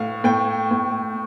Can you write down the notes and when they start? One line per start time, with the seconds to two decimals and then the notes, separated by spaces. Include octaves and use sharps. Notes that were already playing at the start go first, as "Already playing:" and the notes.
Already playing: A2 F5
0.24 A2 G5
0.71 A2